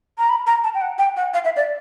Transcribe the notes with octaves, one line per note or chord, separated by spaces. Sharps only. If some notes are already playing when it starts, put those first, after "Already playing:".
A#5
B5
A#5
A5
G5
F#5
G5
F#5
F5
E5
D5